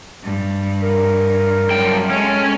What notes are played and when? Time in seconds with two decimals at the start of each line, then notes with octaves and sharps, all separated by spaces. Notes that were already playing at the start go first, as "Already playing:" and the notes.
0.23 G2
0.82 A#4
1.70 F#2 G3 G5
2.10 G#3 C#4 A4